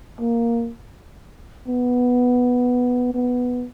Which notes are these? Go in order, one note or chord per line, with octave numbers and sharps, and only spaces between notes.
A#3
B3
B3